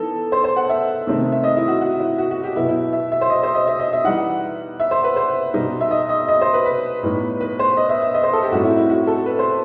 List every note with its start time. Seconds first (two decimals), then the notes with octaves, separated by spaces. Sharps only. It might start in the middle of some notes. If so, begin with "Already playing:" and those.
Already playing: E3 B3 D#4 A4
0.32 C5
0.44 C5
0.56 F#5
0.69 E5
1.07 C3 D#3 A3 C4 D#4
1.32 E5
1.44 D#5
1.57 E4
1.68 F#4
1.81 F#4
2.00 E4
2.18 F#4
2.31 F#4
2.43 G4
2.56 B2 F#3 B3 E4
2.68 E4
2.93 E5
3.12 E5
3.21 C5
3.30 D#5
3.43 C5
3.55 D#5
3.67 E5
3.80 D#5
3.93 E5
4.04 E3 G3 D#4 F#5
4.80 E5
4.91 C5
5.04 B4
5.16 C5
5.54 B2 G3 D#4
5.81 E5
5.91 D#5
6.09 D#5
6.28 D#5
6.41 C5
6.54 B4
6.66 B4
7.03 A2 G3 B3 D#4
7.40 B4
7.59 C5
7.77 D#5
7.89 E5
8.02 E5
8.14 D#5
8.23 C5
8.33 A4
8.43 G4
8.52 A2 G3 C4 D#4 F#4
8.65 E4
8.77 E4
8.89 F#4
9.07 A4
9.26 B4
9.39 C5